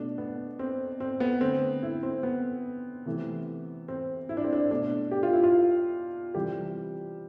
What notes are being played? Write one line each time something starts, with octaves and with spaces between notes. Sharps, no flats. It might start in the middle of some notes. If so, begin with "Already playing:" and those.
Already playing: B2 A3 D4
B3
C4
C4
B3
D3 A3 C4
E4
C4
B3
C3 E3 A3
C4
E4
D4
C4
D4
B2 A3 D4
G4
F4
E4
F4
C3 E3 G3 G4